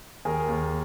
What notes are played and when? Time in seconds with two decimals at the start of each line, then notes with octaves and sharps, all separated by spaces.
0.25 D#2 G#4 A#4
0.48 D#2